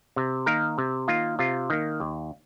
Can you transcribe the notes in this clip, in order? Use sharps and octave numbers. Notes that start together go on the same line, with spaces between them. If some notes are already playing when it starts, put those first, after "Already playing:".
C3
D#3 A#3 A#4
C3
D#3 A#3 F4
C3 F4
D#3 A#3
D#2